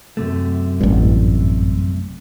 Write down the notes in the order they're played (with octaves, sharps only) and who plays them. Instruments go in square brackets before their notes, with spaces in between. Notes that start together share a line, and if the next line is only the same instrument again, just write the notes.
[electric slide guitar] F#2 C3 A3
[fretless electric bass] A1 G2